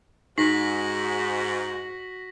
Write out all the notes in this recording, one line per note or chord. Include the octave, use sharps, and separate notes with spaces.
G#2 D#4 F#4 A#6 B6 F#7